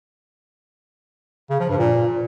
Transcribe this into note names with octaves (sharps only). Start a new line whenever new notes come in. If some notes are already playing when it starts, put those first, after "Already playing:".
C#3
F3
G2
A#2